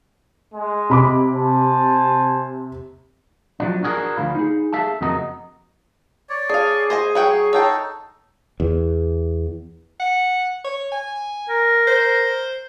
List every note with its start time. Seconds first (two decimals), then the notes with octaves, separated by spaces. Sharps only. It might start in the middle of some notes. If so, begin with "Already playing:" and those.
0.55 G#3
0.90 C3 B5 D6
1.31 C5 G#5 A5
3.60 F3 F#3 D4
3.83 D4 F#4 G#4 A#4
4.17 D2 D3 F3 F5 B5
4.35 D#4 G#4
4.73 G#4 A4 E5 F5 A5
5.01 F2 C#3 A#3 F#4 D#5 A#5
6.29 C#5 D5
6.50 D4 G#4 F5
6.90 C5 D#5 G#5
7.15 F#3 C#5 F#5 G5
7.53 D#4 A4 C#5 F#5 G5
8.60 E2
10.00 F#5
10.64 C#5
10.92 G#5
11.49 A#4
11.87 C5